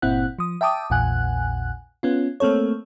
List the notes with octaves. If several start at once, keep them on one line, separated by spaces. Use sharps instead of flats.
G1 A#2 C4 E4 F#5 F#6
F3 D#6
E5 G5 A5 D6 D#6
A#1 E2 A#2 F#5 G#5 F#6
B3 C#4 F4
A3 A#3 C4 A4 C#5